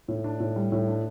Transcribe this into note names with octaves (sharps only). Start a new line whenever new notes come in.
A2
D4
A2
G3
A2
D4